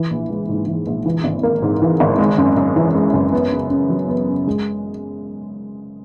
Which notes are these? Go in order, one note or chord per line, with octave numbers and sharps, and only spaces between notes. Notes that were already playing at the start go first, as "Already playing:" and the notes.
Already playing: E3
A#1
G#3
G#2
E3
A#1
E3
G#1
A#3
G#2
E3
G#1
G#3
F#2
F#2
E3
G#3
F#2
B3
C#3
C#3
F#3
B3
C#3
G#3